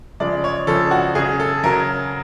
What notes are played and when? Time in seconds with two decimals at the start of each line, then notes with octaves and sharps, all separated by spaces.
0.20 C#3 F3 G#3 D5
0.44 C#5
0.67 C#3 F3 G#3 A4
0.91 F#4
1.15 C#3 F#3 G#4
1.40 A4
1.64 C#3 F#3 A#4